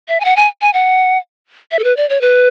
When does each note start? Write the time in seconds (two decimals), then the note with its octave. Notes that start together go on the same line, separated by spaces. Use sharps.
0.08 E5
0.20 G#5
0.25 F#5
0.36 G#5
0.61 G#5
0.74 F#5
1.71 E5
1.79 A4
1.84 B4
1.97 D5
2.09 C#5
2.21 B4